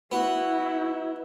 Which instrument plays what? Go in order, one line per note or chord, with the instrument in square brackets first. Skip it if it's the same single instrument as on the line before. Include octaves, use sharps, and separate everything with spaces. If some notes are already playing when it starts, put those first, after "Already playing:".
[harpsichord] B3 [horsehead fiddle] E4 [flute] F#4